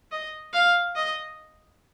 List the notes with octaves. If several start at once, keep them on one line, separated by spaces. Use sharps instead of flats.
D#5
F5
D#5